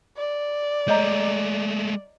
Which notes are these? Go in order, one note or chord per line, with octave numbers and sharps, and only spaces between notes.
D5
G#3 A3 C#5 D#5 A#5